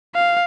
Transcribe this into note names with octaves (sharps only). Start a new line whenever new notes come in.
F5